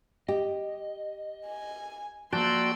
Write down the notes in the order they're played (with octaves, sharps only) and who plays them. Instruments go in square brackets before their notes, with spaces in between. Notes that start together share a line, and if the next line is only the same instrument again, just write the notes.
[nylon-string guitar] G4 [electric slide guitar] D#5
[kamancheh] G#5
[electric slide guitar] F3 A#3 [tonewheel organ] F#4 D5 G5 [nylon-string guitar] A5 [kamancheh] C6 E6